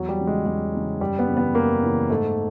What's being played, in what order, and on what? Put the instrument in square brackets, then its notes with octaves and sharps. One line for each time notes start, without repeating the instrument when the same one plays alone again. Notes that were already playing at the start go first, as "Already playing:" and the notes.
Already playing: [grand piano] E2 F#3
G3
C#3 E3
G#3
E2 G3
C#3 E3
F#2 G3
B3
C#3 E3
B3
F#2 A#3
C#3 E3
G#2 A3